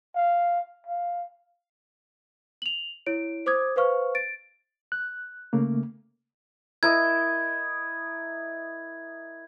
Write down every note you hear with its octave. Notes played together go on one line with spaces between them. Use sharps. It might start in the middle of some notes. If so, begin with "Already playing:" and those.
F5
F5
F7 F#7
E4 C#5 D7
C5 D6 D#6 G#6
B4 C5 F5 C#6 F6
A6 D7
F#6
C#3 A3 A#3
E4 A#4 D#5 G#6